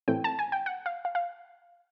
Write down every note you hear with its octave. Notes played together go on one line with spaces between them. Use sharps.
A2 E3 A3 C4 G5
A5
G#5
G5
F#5
F5
F5
F5